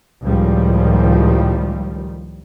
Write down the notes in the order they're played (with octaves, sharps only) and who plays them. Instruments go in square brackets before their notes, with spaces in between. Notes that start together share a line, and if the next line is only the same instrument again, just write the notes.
[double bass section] C#2 A2 D#3 F3 G3